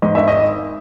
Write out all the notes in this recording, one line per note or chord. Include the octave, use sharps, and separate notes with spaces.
G#2 D#5
G#1 E5
D#5